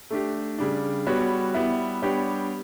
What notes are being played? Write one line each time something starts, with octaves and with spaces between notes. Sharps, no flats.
A3 D4 G4
C#3 G3 D4
G3 B3 F#4 C#5
G3 B3 E4
G3 B3 D4 G4 C#5